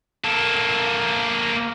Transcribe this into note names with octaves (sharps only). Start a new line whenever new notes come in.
A#3 A4